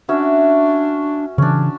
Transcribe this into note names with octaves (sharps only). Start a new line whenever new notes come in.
C#4 D4 F#4 E5
C#3 E3 C#4 D4